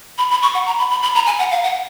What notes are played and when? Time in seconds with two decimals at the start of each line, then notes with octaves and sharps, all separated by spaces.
0.18 B5
0.31 B5
0.42 C#6
0.54 F#5
0.66 A#5
0.79 B5
0.91 B5
1.03 B5
1.15 A#5
1.26 G#5
1.39 F#5
1.51 F5
1.64 F#5